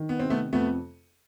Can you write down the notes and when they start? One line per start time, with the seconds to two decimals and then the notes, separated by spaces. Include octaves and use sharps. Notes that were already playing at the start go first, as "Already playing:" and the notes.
Already playing: D#3
0.09 B3
0.19 C3 C4
0.30 A3 B3
0.53 F2 A3 B3